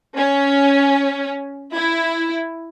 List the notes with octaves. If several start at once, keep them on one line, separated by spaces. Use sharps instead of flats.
C#4
E4